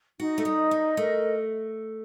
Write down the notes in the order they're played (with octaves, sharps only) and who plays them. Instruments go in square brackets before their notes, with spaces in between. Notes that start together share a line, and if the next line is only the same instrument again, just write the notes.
[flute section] D#4 [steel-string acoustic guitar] F#4
[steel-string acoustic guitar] A3
G3
[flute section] D#5
[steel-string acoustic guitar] G3
[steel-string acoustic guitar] A3 [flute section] A#4